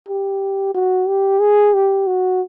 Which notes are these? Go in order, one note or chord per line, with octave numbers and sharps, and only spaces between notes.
G4
F#4
G4
G#4
G4
F#4